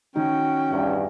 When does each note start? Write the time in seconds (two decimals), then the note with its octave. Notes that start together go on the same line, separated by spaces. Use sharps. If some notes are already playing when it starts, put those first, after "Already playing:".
0.16 D#3 C#4 D#4 F#4 G5
0.70 E2 G2